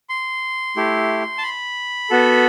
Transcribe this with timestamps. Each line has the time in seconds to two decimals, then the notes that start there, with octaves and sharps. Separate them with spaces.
0.09 C6
0.76 A3 E4 G4
1.38 A5
1.43 B5
2.10 B3 F#4 A4